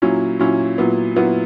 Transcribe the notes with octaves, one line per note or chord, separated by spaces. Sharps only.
A#2 F#3 C#4 E4
A#2 F#3 C#4 E4
A#2 F#3 B3 E4
A#2 F#3 B3 E4